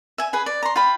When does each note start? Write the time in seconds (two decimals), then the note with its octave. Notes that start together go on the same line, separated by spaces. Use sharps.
0.18 E5 G#5
0.33 G#4 B4 G#5
0.46 D5
0.63 A#5 C6
0.76 F4 G5 B5